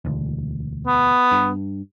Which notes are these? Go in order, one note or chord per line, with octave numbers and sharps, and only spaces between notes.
E1 D2
B3
G2